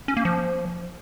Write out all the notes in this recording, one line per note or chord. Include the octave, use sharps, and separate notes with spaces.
C#4
A#3
F3